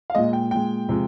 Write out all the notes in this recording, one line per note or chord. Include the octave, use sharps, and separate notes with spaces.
F5
A#2 G#3 D#5
G5
A#2 G#3 G5
C3 F3 G#3